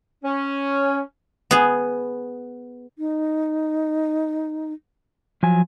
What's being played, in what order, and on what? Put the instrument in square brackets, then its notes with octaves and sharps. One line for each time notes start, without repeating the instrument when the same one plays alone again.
[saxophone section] C#4
[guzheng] B3 G#4
[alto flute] D#4
[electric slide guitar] F3 F#3 G#5